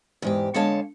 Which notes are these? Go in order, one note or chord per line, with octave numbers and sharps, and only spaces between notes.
E2 G#2 G4
D3 G#3 B3 C#5 F5 A5